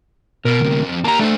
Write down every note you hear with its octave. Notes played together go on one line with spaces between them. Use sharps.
B2 A#4
D2 C3
F2
A#3 G4 A5 A#5
A3 D4 C5